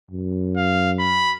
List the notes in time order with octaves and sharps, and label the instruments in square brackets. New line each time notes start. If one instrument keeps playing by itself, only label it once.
[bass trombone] F#2
[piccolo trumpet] F5
B5